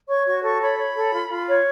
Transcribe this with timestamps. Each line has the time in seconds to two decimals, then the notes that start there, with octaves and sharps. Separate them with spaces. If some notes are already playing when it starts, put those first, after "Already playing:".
0.09 C#5 C#6
0.26 F#4 C#6
0.43 A4 C#6
0.61 C#5 B5
0.78 C#5
0.96 A4
1.13 F4
1.30 F4
1.47 C#5